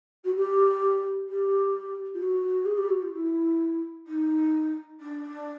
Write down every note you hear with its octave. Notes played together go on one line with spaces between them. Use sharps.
F#4
G4
G4
F4
F#4
G#4
G4
F#4
F4
E4
D#4
D4